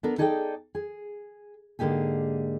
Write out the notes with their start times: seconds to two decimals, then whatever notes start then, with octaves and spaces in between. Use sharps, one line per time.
0.03 B3 D4 A4 A#4
0.18 D#4 G#4 A4 D5 F#5 G5
0.75 G#4
1.79 G#2 D3 A#3 D#4 G4 G#4